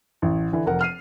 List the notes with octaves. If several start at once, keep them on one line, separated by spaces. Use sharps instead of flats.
A1
D3 E3
F1 A#4 F#5
F6 C7 D#7